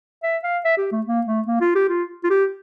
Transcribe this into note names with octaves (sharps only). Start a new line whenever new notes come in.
E5
F5
E5
G4
A3
A#3
A3
A#3
F4
G4
F4
F4
G4